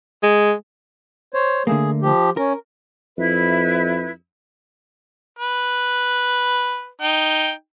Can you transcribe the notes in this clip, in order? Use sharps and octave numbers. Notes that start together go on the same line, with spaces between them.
G#3
C5 C#5
D3 A3 A#3 G#4
F3 G4
C#4 A#4
F2 E4 B4 E5
B4
D#4 G5